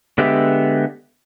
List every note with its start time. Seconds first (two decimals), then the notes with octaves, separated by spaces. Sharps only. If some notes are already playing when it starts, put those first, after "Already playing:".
0.18 D3 G#3 B3 G4 E5